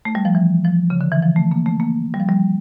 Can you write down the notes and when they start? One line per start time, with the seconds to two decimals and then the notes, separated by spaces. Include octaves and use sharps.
0.05 A3
0.15 G3
0.25 F3
0.35 E3
0.64 F3
0.90 C#3
1.01 D3
1.12 E3
1.23 F3
1.36 A3
1.51 A#3
1.66 A3
1.80 A#3
2.14 G3
2.20 F3
2.29 G3